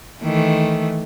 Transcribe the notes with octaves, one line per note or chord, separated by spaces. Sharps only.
D#3 E3 A3